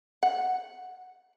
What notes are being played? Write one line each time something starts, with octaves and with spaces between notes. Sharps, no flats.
F#5